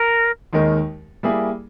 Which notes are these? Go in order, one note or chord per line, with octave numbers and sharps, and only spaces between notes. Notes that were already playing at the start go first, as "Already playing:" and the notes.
Already playing: A#4
D#2 D#3 G#3 D#4 A#4
G3 A#3 E4 G#4